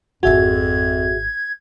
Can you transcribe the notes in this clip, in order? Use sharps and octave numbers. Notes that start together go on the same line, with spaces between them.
G#1 F2 F4 F#4 G#4 E5 G#6